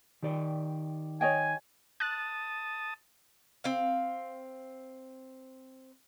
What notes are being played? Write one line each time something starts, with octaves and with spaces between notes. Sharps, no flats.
D#3 G4 D5
C#5 D#5 G5 G#5
A5 D#6 F#6 A6
C4 F5